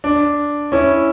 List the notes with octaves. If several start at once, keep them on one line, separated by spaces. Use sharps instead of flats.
D4
C#4 E4